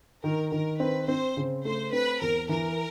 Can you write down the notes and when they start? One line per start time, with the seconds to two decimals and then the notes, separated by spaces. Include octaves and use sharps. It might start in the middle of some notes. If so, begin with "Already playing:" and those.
0.24 D#3 A#4
0.52 D#3 A#4
0.80 C4 B4
1.08 C4 C5
1.37 C#3
1.65 A3 C5
1.92 C4 B4
2.21 E2 A#4
2.49 E3 A#4